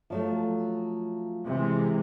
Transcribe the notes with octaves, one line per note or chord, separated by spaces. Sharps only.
F3 F#3 A3
C3 E3 G#3